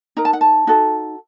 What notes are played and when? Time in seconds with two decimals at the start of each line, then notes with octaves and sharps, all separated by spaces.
0.17 D#4 A#4 A#5
0.25 A5
0.33 F#5
0.41 A5
0.67 D#4 F#4 A4